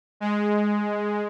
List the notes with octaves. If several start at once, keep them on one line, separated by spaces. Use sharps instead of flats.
G#3